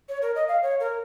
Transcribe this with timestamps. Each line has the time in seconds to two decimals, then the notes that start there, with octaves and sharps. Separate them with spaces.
0.09 C#5
0.22 A#4
0.35 D#5
0.48 F5
0.62 C#5
0.80 A#4